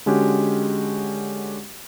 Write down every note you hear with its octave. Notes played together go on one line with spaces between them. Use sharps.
D3 G#3 C#4 F#4 G4